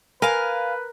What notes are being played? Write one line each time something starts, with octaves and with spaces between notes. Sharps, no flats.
A#4 B4 F5 G#5